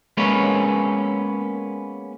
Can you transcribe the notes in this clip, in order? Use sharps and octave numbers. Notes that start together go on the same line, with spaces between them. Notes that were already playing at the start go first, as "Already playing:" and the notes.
G#3 A#3 B3 C#4 B4 C#5